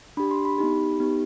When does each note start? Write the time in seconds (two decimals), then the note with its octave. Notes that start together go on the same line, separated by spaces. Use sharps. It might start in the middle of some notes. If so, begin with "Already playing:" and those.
0.17 D4 G4 B5
0.31 C6
0.45 B5
0.58 B3 D#4 G4
1.00 B3 D#4 G4